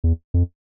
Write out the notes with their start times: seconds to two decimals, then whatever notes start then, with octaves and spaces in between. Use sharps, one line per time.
0.04 E2
0.34 F2